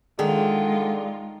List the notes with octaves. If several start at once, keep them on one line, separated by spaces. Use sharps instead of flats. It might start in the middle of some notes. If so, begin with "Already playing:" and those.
D3 D#3 G#3 F4 G#4